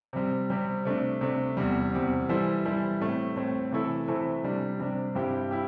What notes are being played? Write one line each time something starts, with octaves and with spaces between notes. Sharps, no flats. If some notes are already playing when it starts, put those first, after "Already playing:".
C3 G3 C4
C3 G3 C4
C3 A3 D4
C3 A3 D4
E2 C3 G3
E2 C3 G3
E3 G3 E4 A4 C5
E3 G3 E4 A4 C5
A2 A3 C4
A2 A3 C4
C3 E3 A3 E4 A4
C3 E3 A3 E4 A4
C3 G3 D4
C3 G3 D4
G2 G3 C4 E4 G4
E4 G4